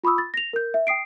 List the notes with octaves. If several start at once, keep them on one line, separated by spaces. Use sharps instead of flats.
F4 B5 C#6 D#6 E6
A6
A#6 F7
A#4 G6
E5
G5 D#6 C7 D7